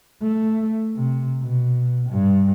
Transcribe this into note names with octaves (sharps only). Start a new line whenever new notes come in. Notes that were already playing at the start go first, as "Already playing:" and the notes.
A3
C3
B2
G2